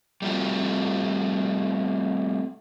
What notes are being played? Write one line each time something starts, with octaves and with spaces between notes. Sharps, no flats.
G3 A3 C4 F4 F#4